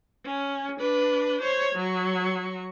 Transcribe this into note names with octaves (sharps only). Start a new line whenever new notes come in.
C#4
D4 B4
C5 C#5
F#3 C#6